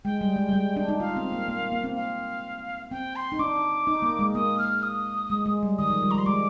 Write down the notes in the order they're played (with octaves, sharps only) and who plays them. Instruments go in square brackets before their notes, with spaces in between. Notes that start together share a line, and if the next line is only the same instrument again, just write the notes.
[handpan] G#3 [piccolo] G5
[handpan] G3
G#3
G3
G#3
D4
D#4
[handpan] F4 [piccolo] F5
[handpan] C4
A#3
A#3
A#3
C4
[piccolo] F5
[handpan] C4 [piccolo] G5
[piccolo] C6
[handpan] D#4
[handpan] D4 [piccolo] D6
[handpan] D#4
A#3
G#3
[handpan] A#3 [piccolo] D#6
[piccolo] F6
D#6
[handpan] G#3
G#3
G3
[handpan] D#3 [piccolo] D#6
[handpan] F3
G3
[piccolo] A#5
[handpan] G3 [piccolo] C6
[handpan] G#3 [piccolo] D6